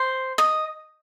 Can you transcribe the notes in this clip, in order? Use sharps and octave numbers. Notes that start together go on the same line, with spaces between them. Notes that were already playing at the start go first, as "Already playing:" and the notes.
Already playing: C5
D#5